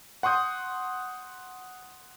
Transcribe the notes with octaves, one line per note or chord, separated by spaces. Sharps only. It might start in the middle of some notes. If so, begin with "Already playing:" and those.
F#5 C6 C#6 D#6 G6